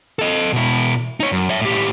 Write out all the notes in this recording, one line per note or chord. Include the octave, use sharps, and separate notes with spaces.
A4 D#5
B2 E4
D#4 C#5
F#2
C#5 E5
A2 G4